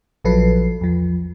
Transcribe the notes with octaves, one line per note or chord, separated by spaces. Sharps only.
A#1 F3 F#3 A4 B4 C7
E2 F3